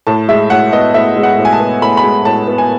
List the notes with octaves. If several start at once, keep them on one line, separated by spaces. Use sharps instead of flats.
A2 A5
G#3 E5
A2 F#5
B3 D#5
A2 E5
G#3
F#5
A2
G#5
A5
B3
A2 B5
B5
G#3
A2 A5
B3
G#5